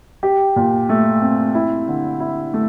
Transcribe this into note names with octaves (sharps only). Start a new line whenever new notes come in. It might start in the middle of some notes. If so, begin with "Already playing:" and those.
G4
A#2
A3
C4
E4
D3
E4
A3